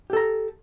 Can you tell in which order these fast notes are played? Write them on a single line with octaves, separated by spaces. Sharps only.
G4 A4 A#5